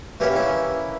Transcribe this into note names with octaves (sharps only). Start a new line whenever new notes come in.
E3 A#3 C#4 G4
E4